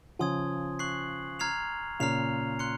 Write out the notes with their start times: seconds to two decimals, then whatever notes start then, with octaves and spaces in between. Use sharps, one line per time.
0.19 C#3 F3 G#5 C6 D#6 G#6
0.79 C#6 F#6 C7 F#7
1.39 A#5 F6 G#6 C7 F7
2.00 A#2 C#3 A#5 F6 C7 F7
2.59 C6 F#6 C#7